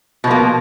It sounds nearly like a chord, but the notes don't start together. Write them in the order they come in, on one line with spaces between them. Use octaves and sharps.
B2 F3 A#3